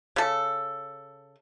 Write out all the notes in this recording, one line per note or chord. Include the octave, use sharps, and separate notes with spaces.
C#3 A4